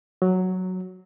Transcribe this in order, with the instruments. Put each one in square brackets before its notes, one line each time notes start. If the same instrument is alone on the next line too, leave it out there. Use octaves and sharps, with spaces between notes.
[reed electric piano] F#3